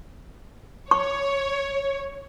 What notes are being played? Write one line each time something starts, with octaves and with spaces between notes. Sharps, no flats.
C#5 C#6